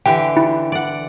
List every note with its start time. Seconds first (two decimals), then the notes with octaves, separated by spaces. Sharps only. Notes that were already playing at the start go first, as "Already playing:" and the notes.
0.06 D3 E3 G4 G5
0.37 E4
0.72 D5 F#5